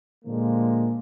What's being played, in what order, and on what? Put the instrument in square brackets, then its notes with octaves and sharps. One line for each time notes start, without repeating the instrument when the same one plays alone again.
[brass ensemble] A#2 D3 F3 G#3 A#3